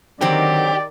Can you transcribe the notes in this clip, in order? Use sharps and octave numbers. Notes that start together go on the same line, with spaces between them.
D3 D#3 F#3 C4 G4 D5